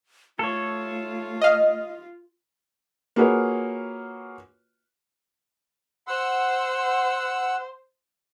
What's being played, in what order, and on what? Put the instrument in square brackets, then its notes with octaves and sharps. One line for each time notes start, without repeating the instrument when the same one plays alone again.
[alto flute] A3 [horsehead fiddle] F4 [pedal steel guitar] A4 C#5
[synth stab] D#5 F5
[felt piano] A#3 F4 F#4 G#4 B4 C#5
[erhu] C5 [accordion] F#5 E6